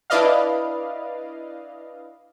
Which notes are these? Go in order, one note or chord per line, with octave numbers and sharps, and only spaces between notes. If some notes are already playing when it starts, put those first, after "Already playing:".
D4 E4 B4 D5 D#5 F5